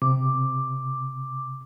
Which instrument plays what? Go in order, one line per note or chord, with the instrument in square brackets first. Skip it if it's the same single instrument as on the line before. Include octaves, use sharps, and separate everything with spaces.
[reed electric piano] C3 [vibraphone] D6